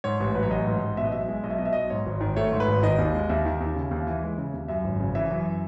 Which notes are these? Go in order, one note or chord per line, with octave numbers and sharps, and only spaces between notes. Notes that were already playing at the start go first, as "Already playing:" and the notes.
G#2 C#5
A1
F#3 B4
C#5
A1 D#5
G#2
A1
B2 E5
D#5
B1 E5
G#3
B1 D#5
E5
B2 D#5
E5
B1 D#5
G#2 C#5
G#1
D#3
A3 C#5
G#2
B4
G#1
D#3 D#5
D#2
G#3
D#2 E5
D#3
D#2
C#3
D#2
E3
G#3
C#3
D#2
F#2 E5
G#1
C#3
E3 E5
F#2